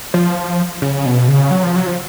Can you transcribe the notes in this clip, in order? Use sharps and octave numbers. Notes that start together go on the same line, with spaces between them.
F3
C#3
B2
C#3
F#3
F3
F#3
F3